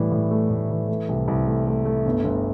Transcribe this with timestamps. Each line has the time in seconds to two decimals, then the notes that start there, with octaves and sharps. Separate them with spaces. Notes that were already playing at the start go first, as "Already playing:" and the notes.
Already playing: A2 E3 G3
0.12 A2
0.31 A3
0.50 A2
0.70 E3
0.88 A3
1.09 C2
1.28 C2
1.47 A3
1.66 A3
1.85 A3
2.06 G1
2.24 G1